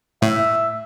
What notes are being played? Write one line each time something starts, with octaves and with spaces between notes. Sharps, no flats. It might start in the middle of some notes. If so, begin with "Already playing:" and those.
A2 E5